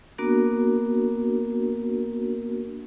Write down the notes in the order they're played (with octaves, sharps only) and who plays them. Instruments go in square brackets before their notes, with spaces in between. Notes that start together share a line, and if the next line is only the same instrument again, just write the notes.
[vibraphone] A#3 B3 D4 F#4 A#4